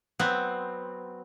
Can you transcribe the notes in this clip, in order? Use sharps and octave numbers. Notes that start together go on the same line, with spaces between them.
F#3 B3 C4